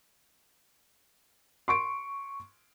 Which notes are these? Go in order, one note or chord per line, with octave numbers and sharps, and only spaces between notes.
C6 C#6 D7